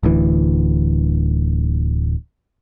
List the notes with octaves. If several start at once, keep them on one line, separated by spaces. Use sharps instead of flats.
D1 D2 E3